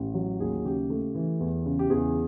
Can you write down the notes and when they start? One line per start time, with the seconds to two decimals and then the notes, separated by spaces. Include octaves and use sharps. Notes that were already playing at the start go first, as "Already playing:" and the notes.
Already playing: A1 G4
0.15 F#3
0.40 D#2 G#4
0.65 C#3 G4
0.90 A3
1.15 E3
1.40 E2
1.66 C#3
1.79 G4
1.90 E2 G#4